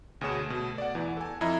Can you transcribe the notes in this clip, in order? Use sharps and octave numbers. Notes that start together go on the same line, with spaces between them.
D2 B2 G#4 C#5 E7
B2 A3
D5 F#5
E2 E3
A4 G#5
F2 E4 D#5 A#5 G#6